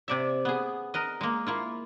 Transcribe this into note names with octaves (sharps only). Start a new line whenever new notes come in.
C3 D5 E5
B3 G#4
A#4 B4 D#5
G#3 A#3
A#3 E4 F4